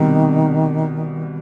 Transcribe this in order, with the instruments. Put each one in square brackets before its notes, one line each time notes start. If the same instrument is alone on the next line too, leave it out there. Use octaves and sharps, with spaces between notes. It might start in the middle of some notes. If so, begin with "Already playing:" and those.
Already playing: [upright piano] C2 B2 G3 C4 [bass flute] D#3